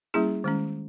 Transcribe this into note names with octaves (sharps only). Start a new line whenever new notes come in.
G3 A#3 C#4 E4 G#4
D#3 G#3 C#4